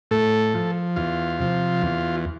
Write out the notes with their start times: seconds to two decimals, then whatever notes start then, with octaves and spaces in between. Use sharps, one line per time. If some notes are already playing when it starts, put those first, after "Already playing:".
0.11 A2 A4
0.55 F3
0.96 E2 F4
1.40 C3 F3
1.82 E2